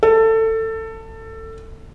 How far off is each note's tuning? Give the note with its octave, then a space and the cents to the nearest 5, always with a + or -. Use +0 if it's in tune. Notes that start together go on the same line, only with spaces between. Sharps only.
A4 +20